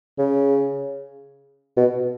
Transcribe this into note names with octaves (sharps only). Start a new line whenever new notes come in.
C#3
B2